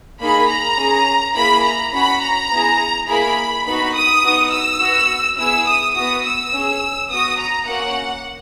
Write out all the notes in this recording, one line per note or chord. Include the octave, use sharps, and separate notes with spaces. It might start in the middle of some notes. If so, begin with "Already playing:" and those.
A#3 D#4 G#4 B5
A#5
C#4 G#4
A#3 E4 G#4 B5
A#5
C#4 F#4 B5
A#5
B3 E4 G#4
A#3 E4 G#4 B5
B3 D#4 F#4 B5
D#6
B3 D#4 F#4
E6
B3 F#4
B3 E4 G#4 E6
D#6
B3 F#4 D#6
E6
C#4 G#4
B3 F#4 D#6
A#5
A#3 C#4 F#4 F#5